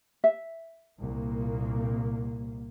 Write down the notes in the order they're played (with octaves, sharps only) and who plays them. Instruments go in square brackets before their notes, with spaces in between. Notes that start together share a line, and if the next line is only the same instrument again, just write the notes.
[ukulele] E5
[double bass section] C2 A#2 A#3